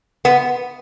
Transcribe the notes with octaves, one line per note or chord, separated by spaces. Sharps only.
B3